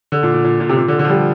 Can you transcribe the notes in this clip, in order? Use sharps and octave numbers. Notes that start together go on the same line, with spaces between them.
D3
A#2
A#2
A#2
A#2
C3
A#2
D3
D3
F3
G3